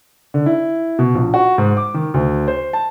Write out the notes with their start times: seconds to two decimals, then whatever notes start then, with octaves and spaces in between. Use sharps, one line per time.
0.34 D3
0.46 E4
0.99 B2
1.15 A#1
1.34 F#4
1.58 G#2
1.77 D6
1.94 D#3
2.14 D2
2.48 C5
2.73 A5